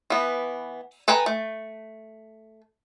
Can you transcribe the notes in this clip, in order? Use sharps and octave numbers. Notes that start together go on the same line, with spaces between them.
E3 B3
A4 B4 G5 G#5 A#5
A3